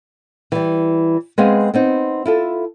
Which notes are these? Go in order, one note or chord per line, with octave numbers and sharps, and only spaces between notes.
E3 G3
G#3 B3 C4 G#4 B4 F5
B3 C4 D#4
E4 F4 A4